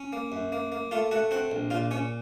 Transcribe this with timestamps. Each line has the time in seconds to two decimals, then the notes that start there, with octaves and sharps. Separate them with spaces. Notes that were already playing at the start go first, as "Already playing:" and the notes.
Already playing: C#4
0.13 A#3
0.32 F#2
0.52 A#3
0.72 A#3
0.91 A3 F4 F5
1.11 A3 F#4 F#5
1.31 C4 F#4 F#5
1.52 A#1
1.70 A#2 F4 F5
1.91 A#2 C#4 C#5